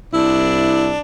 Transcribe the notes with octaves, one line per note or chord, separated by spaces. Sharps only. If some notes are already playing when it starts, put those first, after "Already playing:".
C2 D4 E4